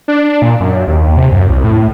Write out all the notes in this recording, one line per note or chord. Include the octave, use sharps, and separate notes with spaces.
D4
A#2
F#2
D#2
C3
F#2
C2
A2